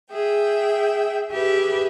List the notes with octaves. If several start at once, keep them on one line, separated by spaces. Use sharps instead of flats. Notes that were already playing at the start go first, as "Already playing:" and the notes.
G#4 E5 G5
G4 G#4 B4 E5